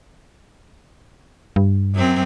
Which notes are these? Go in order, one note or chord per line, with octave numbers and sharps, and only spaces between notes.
G2
F#2 F#3 C4